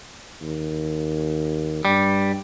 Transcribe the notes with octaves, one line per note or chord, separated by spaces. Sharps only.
D#2
G2 G3